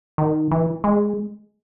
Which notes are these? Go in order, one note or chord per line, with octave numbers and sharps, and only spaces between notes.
D#3
E3
G#3